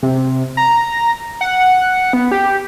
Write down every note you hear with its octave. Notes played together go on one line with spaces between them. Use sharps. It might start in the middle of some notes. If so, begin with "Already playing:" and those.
C3
A#5
F#5
B3
G4